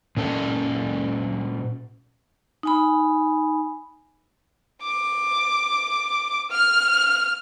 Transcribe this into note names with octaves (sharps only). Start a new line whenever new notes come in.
A#2 C#4 A4
D#4 G#5 B5
D6
F6